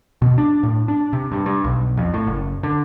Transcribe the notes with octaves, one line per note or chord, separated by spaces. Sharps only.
B2
D4
A2
D4
C3
G2
G2
B1
F2
A2
F#1
D3